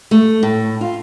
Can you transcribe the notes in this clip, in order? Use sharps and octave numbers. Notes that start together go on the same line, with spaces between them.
A3
A2
F4